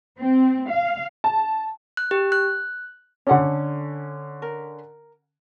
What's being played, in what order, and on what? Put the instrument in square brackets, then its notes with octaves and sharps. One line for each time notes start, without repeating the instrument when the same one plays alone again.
[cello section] C4
F5
[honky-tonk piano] A5
[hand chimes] F#6
G4
F#6
[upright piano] D3 C#4 [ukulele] D4 A4 F#5
[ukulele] A#4